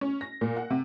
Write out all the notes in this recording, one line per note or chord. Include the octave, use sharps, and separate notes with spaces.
C#4
A#6
A#2
F#5
C3